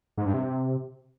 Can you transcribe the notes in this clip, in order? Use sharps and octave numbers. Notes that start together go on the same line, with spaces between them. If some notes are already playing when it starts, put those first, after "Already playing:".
G#2
G2
C3